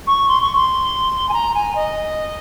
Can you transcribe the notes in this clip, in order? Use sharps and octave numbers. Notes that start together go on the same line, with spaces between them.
C#6
C6
C#6
C6
G#5
A#5
G#5
D#5